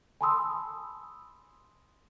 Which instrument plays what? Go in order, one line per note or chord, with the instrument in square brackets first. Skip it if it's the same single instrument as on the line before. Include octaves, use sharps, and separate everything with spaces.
[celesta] G#5 A5 B5 C6 D#6 E6